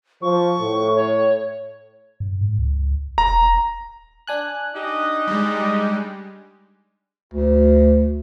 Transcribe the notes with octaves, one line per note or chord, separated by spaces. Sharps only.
F3 C#6
A2
C#5
G2
G#2
C#2
E1 A#5
D4 G#5 F#6
D#4 G4 D#5
G3 G#3
D2